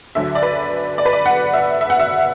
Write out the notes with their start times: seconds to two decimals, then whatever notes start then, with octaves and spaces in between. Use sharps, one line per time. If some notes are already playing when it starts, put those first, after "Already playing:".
0.15 D2 D3 F#3 E5
0.35 D5
0.43 B4
0.98 D5
1.06 B4
1.13 D5
1.26 F#5
1.53 E5
1.81 E5
1.90 F#5
2.00 E5